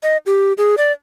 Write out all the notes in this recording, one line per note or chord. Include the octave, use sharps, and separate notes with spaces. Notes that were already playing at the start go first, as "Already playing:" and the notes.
D#5
G4
G#4
D5